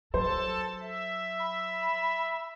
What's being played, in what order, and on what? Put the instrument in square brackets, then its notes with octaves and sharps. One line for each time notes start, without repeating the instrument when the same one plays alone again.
[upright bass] F#3 [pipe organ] A4 A5 [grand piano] C5
[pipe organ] E5
[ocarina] B5